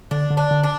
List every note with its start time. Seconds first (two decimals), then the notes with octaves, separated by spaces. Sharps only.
0.11 D3 D4
0.30 D3
0.37 D4
0.51 D3
0.63 D4